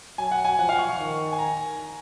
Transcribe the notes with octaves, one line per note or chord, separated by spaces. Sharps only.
F#3 G#5
F#5
G#5
F3 F#5
F5
C#6
C#6
D#3
G#5
A#5